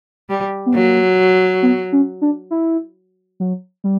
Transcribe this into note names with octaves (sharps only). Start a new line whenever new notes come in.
G3
B3
F#3 A#3
B3
C#4
D4
E4
F#3
G3